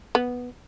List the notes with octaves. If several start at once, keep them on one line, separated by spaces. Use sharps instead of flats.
B3